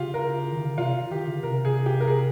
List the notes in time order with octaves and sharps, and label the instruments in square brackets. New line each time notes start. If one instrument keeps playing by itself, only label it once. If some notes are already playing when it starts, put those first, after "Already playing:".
Already playing: [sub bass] C#3 [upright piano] F4 G4
[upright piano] A#4
[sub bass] D#3
C#3
[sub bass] C3 [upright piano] F4
[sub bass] D#3 [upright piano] G4
[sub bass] C#3
[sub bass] C3 [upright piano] A#4
[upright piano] G#4
G4
A#4
G#4